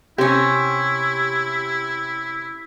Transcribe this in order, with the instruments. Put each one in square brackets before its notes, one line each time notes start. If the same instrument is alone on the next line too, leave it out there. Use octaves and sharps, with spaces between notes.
[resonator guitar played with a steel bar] C3 C#4 [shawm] E4 [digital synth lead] G4